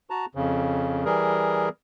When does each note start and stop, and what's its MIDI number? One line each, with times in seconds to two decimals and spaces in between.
0.10 0.26 66
0.10 0.26 81
0.10 0.26 82
0.35 1.04 41
0.35 1.04 49
1.05 1.69 52
1.05 1.69 55
1.05 1.69 68
1.05 1.69 70